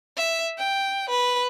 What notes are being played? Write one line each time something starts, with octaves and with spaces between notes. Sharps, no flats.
E5
G5
B4